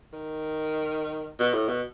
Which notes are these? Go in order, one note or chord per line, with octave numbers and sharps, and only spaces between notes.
D#3
B2
A2
B2